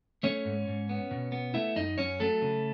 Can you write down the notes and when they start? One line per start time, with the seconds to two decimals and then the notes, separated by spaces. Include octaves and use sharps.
0.23 A3 C#4 C#5
0.45 G#2
0.67 G#2
0.89 B3
1.11 B2
1.32 B3
1.54 A3 E4 E5
1.76 F#2 D#4 D#5
1.98 F#2 C#4 C#5
2.20 F#3 A3 A4
2.42 C#3